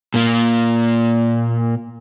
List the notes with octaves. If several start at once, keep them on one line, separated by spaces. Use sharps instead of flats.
A#2 A#3